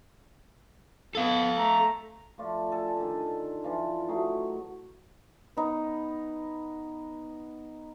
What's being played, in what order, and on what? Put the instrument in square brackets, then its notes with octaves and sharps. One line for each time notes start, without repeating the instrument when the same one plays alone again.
[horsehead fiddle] B3 [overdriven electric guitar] A4 F5
[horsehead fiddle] A3 [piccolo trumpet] A#5
[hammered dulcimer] F3 A3 F4 D5
A4 G#5 A5
D3 D#3
E3 F3 D4 F4
F#3 A3 D#4 G#4
B3 D#4